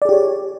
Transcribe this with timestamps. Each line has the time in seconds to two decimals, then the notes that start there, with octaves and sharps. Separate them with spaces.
0.02 D5
0.05 G#4
0.09 G4
0.13 C#5